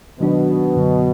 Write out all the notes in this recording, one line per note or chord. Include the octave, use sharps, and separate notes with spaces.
B2 D#3 F#3 D4
F#2 D3 F#3